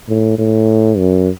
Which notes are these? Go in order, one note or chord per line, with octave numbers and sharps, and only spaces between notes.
A2
A2
F#2